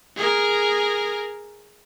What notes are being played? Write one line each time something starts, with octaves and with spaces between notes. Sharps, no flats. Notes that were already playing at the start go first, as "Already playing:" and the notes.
G#4 A#4